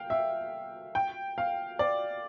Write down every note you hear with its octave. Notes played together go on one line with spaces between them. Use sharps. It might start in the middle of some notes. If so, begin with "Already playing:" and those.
Already playing: F5 G5
E5
G5
F5
D5